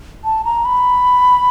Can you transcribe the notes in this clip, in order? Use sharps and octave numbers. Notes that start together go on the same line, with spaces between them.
A5
A#5
B5